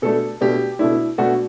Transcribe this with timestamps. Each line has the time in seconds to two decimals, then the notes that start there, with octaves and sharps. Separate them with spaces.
0.02 B2 A3 D4 A4
0.41 B2 A3 D4 G4
0.79 B2 A3 D4 E4
1.18 B2 A3 D4 F#4